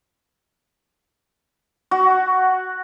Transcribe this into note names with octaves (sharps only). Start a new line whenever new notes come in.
F#4